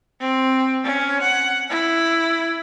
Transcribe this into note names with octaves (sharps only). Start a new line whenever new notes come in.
C4
C#4
F#5
E4